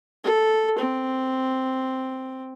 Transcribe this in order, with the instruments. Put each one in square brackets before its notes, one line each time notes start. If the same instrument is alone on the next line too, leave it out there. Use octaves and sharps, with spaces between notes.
[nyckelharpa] A4
C4